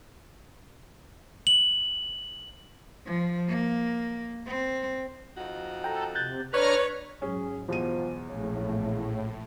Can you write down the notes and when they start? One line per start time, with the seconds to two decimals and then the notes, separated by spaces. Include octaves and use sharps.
1.47 F#7
3.06 F3
3.49 A#3
4.46 C4
5.38 F2 D#4 F#4
5.84 A4 G5 A#5
6.15 C3 F#6 G6 A6
6.54 D4 B4 C#5 D5 A#5 F6
7.22 G#2 F#3 C#4 G#4
7.68 E2 B2 F3 D#7
8.29 A#1 A2 C#3 F3 C4